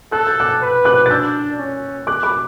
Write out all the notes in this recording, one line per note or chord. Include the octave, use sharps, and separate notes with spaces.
A4 F#6
G6
D6 F#6
B4
D6 F#6
A6
D4 E6 G6
C#4
D6 F#6
B5 D6